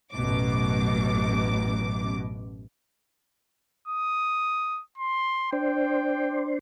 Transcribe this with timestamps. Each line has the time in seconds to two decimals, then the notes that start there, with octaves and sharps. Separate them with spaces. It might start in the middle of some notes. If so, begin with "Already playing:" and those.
0.13 A1 F#2 B2 D6
3.88 D#6
4.98 C6
5.53 D4 C5 G5